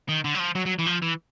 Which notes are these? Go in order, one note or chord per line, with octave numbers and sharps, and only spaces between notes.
D#3
D3
F#3
F3
F#3
F#3
E3
F3
E3